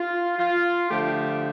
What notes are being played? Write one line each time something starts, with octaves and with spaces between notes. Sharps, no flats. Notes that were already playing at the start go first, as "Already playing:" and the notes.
Already playing: F4
F4
D3 F3 A3 G4